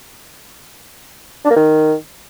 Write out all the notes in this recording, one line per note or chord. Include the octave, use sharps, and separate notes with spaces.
D4
A#3
D#3